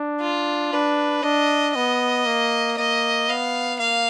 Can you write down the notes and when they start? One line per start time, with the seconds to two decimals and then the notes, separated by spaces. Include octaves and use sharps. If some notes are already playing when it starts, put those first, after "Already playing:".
Already playing: D4
0.21 F4
0.73 D4 B4
1.23 D4 D#5
1.75 B3 D#5
2.26 A#3
2.78 A#3 D#5
3.28 B3 F5
3.79 A#3 F5